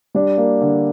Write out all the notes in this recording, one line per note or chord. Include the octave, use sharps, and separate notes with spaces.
G3 D4
A#3
D3